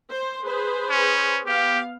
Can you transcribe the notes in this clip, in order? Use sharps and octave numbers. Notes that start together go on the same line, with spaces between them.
C5
G#4 B4 C5
C#4
B3 G4 F5